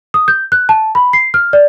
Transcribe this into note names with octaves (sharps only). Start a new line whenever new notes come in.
D#6
G6
F#6
A5
B5
C7
F6
D5